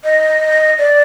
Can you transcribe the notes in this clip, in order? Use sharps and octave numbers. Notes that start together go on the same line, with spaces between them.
D#5
D5